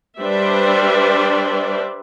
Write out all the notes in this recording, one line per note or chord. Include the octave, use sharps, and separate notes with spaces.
G3 D4 B4 C5 D5 E5